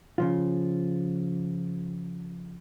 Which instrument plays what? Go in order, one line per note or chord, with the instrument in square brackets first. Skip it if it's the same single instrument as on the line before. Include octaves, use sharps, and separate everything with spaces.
[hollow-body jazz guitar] C#3 F3 F4